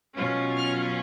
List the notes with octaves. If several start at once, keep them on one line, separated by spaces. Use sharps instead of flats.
B2 F#3 C#4 F4
F6